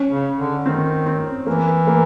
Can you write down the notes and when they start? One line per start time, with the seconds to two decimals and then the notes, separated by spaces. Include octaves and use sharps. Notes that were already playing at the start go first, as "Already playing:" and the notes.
Already playing: C#4
0.11 C#3
0.38 D3
0.65 D#3 C4
1.06 C4
1.46 E3 A#3
1.87 A#3